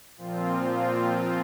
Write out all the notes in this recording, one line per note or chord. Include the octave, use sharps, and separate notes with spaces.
A#2 F3 C4 F4